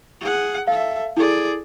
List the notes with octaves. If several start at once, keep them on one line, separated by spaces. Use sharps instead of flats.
G#4 F#5
A4 E5 F5
E4 G#4 A4 D5